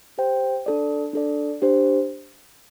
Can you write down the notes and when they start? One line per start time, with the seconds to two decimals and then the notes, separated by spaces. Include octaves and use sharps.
0.18 G4 C5 G5
0.66 D4 A4 D5
1.13 D4 A4 D5
1.62 D4 G4 C5